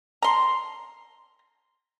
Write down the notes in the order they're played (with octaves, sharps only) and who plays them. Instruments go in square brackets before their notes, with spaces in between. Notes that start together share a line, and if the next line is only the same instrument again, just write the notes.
[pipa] A#5 C6